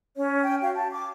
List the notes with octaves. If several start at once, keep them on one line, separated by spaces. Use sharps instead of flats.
C#4 C#5
G5
F#4 F5
A5
D6